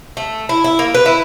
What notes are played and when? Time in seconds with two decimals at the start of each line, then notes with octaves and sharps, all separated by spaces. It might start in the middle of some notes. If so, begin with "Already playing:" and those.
0.17 A3
0.49 E4
0.64 E4
0.79 A#3
0.95 B4
1.06 E4